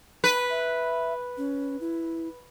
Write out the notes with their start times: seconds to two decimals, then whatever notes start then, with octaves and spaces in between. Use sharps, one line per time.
0.24 B4
0.50 E5
1.37 C#4
1.81 E4